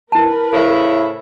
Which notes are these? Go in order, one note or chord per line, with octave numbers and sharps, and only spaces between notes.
E4 A#4 B4 A5
A2 C#3 E4 A4 C5 E5